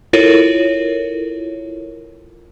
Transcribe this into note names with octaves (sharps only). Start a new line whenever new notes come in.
E4 F4 A4 A#4 C#5